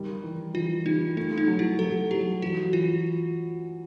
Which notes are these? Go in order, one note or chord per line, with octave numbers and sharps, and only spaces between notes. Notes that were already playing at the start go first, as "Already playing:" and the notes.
Already playing: D#3 G3
E3
E3 F4
G3 D#4
A3 D#4
D#4
F#3
E4
F#3 A4
F#3 G4
E3 F#4
E3 F4